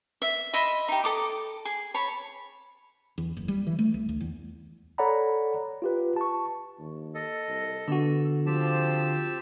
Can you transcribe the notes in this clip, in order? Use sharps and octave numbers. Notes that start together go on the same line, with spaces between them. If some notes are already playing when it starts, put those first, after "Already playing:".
E5
D#5 E5 B5 C6
D#4 G4
A4 D6 D#6
G#4
C#5 A5 B5
E2
F#1
G3
E3
A3
C2
D2
E2
A4 C#5 D5 F#5 A#5 B5
F4 G4 B4
A5 C#6
D#2
A4 D#5
C2
D3 B3 F#4 E6
F3 C4 G4 A5